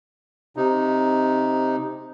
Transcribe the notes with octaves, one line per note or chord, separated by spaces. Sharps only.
C3 D#4